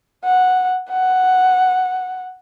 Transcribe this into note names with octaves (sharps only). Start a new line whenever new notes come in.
F#5
F#5